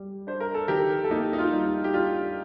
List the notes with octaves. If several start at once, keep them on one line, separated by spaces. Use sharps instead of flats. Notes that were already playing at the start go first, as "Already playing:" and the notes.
Already playing: G3
D4 C5
A#4
A4
D#3 G4 A#4
A4
A#3 D#4 G4
D#4
F4
G3
D#4
G4
D4 F4